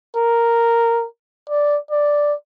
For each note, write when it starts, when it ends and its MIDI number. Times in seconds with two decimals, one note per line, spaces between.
0.17 1.06 70
1.50 1.78 74
1.91 2.34 74